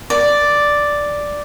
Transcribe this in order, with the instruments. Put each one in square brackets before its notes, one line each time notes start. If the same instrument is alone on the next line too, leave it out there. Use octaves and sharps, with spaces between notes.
[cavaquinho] D5